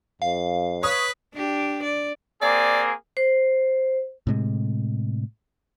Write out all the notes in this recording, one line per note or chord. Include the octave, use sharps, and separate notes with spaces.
F2 F5
B4 C#5 D#6
D4 G4
D5
A#3 C4 G#4 D5
C5
A2 C3 G#3